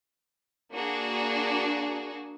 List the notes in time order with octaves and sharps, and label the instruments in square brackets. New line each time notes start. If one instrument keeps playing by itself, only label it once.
[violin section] A#3 D4 F#4 G#4